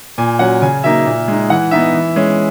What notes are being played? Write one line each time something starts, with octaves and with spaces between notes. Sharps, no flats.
A#2 G#5
F#3 C#4 F#5
C#3 G#5
F#3 A#3 D#4 E5
A#2
G#3 D#4
E3 F#5
B3 D#4 E5
E3
G#3 C#4